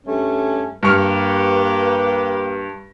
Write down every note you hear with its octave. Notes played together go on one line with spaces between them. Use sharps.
G2 A3 C#4
G2 A#3 G4 B4 C#6 F6